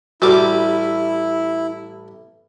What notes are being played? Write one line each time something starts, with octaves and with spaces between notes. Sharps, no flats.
A1 G3 E4 F#4 D6